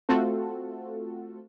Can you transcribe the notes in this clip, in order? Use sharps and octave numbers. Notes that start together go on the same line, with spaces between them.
A3 C4 F4 F#4 A4